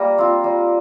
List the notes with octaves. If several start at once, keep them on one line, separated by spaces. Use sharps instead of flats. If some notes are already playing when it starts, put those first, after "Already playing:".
Already playing: G3 A#3 A#5
C4 F4
G3